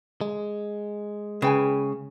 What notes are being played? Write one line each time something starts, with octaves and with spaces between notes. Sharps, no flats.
G#3
C#3 B4 G5 G#5